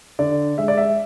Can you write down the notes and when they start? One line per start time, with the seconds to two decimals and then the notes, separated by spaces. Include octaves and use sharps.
0.19 D3 D5
0.58 G#3 E5
0.68 D5
0.78 E5